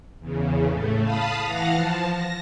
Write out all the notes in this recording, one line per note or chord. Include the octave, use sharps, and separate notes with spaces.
E2 C#3
A2 A3
F5 A5 B5 D#6
E3 F5 F#5 F6 A#6
F3 A5
A#6